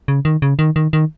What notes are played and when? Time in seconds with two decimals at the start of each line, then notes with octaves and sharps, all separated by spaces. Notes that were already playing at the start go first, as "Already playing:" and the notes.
0.08 C#3
0.25 D#3
0.42 C#3
0.59 D#3
0.76 D#3
0.93 D#3